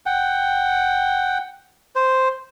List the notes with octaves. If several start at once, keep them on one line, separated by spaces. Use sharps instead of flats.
F#5 G5
C5